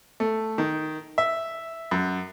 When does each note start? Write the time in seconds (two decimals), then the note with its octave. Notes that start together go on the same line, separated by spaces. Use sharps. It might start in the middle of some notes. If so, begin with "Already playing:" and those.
0.20 A3
0.58 D#3
1.18 E5
1.91 F#2